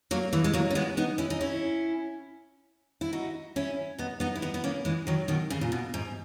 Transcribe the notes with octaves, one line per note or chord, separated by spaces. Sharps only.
F#3 A#3
E3 G#3
G#3
F#3 A#3
C#4
G#3 B3
B3 D#4
C#4 E4
D#4
C#4 E4
E4
D#4 F#4
C#4 E4
B3 D#4
B3 D#4
E4
B3 D#4
B3
A#3 C#4
E3 G#3
D#3 F#3
B2 D#3
C#3
A#2
B2
G#2